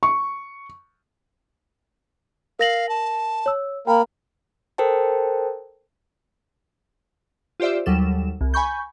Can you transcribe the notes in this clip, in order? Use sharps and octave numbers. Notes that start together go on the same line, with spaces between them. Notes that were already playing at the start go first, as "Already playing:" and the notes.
C#6
A#4 F5 A#6 F#7
A5
C#5 E6
A#3 A#4 G5 B5
A4 A#4 C5 G5 A5
F4 G4 C5 D5 E5
D#2 F#3 G3 A4 E7
C2
G#5 B5 C#6 G6